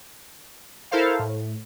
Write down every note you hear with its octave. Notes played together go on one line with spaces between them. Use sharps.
E4 A4 A#4 C5 F5
A2